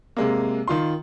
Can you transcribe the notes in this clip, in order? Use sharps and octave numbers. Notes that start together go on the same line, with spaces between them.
C3 G#3 A#3
D#3 F4 C6